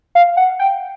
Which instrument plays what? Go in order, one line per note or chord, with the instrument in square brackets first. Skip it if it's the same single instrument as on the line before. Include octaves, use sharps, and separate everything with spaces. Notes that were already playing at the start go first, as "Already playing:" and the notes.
[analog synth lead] F5
F#5
G5